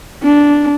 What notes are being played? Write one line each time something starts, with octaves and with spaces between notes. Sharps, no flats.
D4